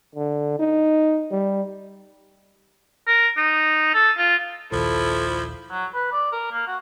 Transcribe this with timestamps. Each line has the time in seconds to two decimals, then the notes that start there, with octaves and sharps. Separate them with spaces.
0.15 D3
0.59 D#4
1.31 G3
3.08 A#4
3.37 D#4
3.94 A4
4.17 F4
4.72 A#1 D#2 F3 E4 A4
5.70 F#3
5.94 B4
6.12 D5
6.32 A#4
6.52 A#3
6.67 F#4